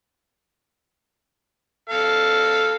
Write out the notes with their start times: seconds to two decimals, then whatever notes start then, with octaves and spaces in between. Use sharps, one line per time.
1.90 A4 F5